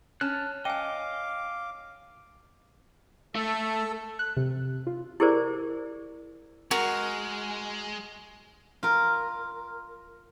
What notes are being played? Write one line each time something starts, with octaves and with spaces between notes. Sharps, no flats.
C#4 A5 F6 F#6
D#5 F5 G5 G#5 D6
A3 A4
F#6
C3
F4
E4 G4 G#4 A#4 C5 D5
G#3 F#4 A#4
F4 A#4